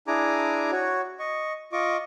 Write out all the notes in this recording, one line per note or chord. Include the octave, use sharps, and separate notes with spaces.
D4 E4 G#4 G#5 A#5 D6
F#4 C#5
D#5 C#6
F4 D#5 C#6 D6